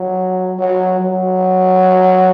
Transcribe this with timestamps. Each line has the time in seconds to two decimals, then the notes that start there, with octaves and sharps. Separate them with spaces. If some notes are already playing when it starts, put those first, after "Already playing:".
Already playing: F#3
0.59 F#3
1.00 F#3